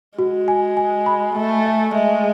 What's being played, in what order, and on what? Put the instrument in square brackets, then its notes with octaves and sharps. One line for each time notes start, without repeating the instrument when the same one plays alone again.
[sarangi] G#3 [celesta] F#4
[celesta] G#5
G#5
B5
[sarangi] A3 [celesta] G#5
[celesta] E5
[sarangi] G#3 [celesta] E5